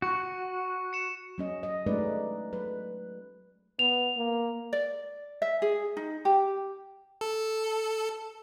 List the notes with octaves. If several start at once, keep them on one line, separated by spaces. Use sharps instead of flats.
F#4 C#6 C#7
C#7 E7
F#3 C#4 D#5
D#5
G#3 A3 C#4 D#4 B4 D5
F#3 B4
B3 F7
A#3
D5
E5
G#4
D#4
G4
A4